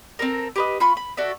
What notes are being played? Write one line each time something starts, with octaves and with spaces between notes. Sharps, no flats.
C4 G4 A4 A#4
G4 B4 D#5
F4 B5 C#6
B5
F#4 A4 D5 E5